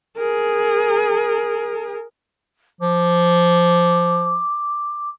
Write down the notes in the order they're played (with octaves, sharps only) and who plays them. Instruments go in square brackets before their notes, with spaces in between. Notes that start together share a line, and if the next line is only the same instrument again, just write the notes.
[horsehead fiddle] G#4 A#4
[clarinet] F3 [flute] D6